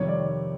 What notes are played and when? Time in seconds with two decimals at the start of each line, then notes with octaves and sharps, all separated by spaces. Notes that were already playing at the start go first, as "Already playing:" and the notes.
Already playing: F2 C3 D#3 G3 C#5
0.08 D5